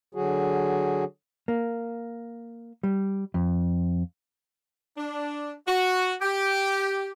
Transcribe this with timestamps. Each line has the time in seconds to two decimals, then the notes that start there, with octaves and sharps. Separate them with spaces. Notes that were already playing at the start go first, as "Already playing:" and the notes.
0.15 D3 F#3 F#4 G#4
1.48 A#3
2.83 G3
3.34 F2
4.97 D4
5.67 F#4
6.21 G4